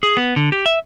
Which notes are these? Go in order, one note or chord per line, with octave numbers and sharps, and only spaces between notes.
G#4
B3
D3
G4
E5